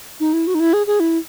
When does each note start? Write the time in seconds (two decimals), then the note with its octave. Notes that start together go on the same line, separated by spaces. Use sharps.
0.20 D#4
0.33 E4
0.47 F#4
0.55 D#4
0.60 E4
0.73 G#4
0.87 G#4
1.00 E4